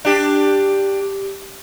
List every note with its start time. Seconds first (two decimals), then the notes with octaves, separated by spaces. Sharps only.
0.05 D4 G4